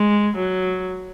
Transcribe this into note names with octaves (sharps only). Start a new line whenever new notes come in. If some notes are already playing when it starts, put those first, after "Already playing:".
Already playing: G#3
F#3